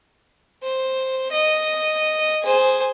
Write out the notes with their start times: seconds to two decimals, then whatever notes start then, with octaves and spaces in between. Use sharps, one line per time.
0.63 C5
1.32 D#5
2.43 G#4 C5